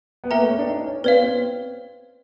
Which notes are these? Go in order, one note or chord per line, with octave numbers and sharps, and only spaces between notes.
B3
A#3 B4 E5 G5 A#5
A3
C#4
D4
D#4
C#4
C4 B4 D5 F5
C4